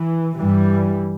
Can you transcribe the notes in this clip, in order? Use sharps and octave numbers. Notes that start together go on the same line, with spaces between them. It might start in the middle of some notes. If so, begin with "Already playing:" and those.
Already playing: E3
G2 E3 G3